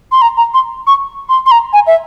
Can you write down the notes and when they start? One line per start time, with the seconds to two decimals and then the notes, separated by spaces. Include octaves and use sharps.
0.12 C6
0.22 A#5
0.37 A#5
0.54 C6
0.87 C#6
1.29 C6
1.46 C6
1.51 A#5
1.73 G#5
1.87 E5